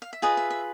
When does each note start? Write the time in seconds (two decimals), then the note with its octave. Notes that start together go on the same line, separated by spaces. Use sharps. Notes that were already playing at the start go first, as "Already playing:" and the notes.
0.02 F5
0.13 E5
0.22 F4 G#4 B4 D#5
0.37 E5
0.50 E5